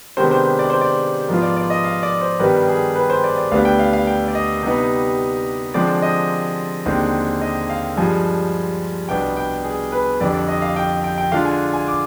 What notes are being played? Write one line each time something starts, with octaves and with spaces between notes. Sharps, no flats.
C3 D#3 G#3 B3 D4 C5
C5
D5
C5
D5
G#2 F3 B3 F4
D5
D5
D#5
F5
D5
C5
G2 D#3 G3 B3 B4
G#4
B4
C5
D5
D5
D2 D3 G3 B3 F5
G5
F5
F5
G5
D5
D#5
C3 G3 B3 D#4
D3 F3 G#3 C4 D5
D#5
D#2 D3 G#3 C4 D#4
D#5
F5
G2 F3 G#3 G#5
C2 B2 B3 D4 G5
G5
G#4
B4
F2 D3 G3 D5
D5
D#5
F5
G5
G5
G5
D3 G#3 D4 F4 F5
G#5
G#5
D6